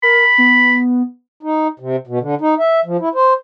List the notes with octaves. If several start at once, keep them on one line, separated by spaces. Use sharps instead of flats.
A#4 B5
B3
D#4
C3
B2
D3
D#4
E5
F3
E4
C5